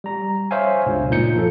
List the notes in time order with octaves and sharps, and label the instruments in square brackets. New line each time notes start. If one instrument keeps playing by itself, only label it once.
[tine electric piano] G3 A#5
C5 C#5 E5 F5 G#5
C#2 G2 B2
A#2 A#3 D#4 G6 C#7
F3 A4